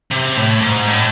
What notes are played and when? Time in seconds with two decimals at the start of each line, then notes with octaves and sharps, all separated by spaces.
0.11 C3
0.37 A2
0.62 G#2
0.87 A2